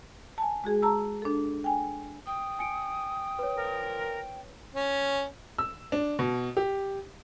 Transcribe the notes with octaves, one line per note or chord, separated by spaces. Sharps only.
G#5 A5
G#3 F#4 G#4
A5 A#5 E6
D4 A4
G5 G#5
G5 D#6
G#5 C#7 D7
B4 C#5
A#2 F3 A#4
C#4
E6
D4
B2
G4